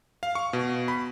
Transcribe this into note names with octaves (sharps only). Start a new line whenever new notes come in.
F5
C#6
B2
B5